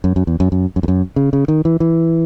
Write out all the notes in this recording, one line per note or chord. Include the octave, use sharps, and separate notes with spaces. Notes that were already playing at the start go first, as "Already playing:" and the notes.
F#2
F#2
E2
F#2
F#2
F#2
E2
F#2
C#3
C#3
D#3
E3
E3